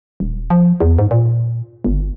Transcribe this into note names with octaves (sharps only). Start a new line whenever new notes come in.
D#1
F3
E2
G#2
A#2
G1